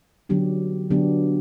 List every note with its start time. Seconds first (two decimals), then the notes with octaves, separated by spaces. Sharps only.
0.29 D3 F#3 B3 D4 G4
0.90 D3 F#3 B3 D4 G4